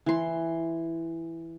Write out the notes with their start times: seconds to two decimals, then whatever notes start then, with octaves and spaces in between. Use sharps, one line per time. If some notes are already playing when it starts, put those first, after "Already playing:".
0.06 E3 C6